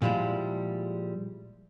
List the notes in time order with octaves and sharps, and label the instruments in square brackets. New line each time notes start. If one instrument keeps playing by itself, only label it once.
[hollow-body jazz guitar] A#2 F3 G3 G#3 E4